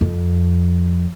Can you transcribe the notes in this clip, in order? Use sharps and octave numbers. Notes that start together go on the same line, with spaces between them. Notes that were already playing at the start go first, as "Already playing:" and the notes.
F2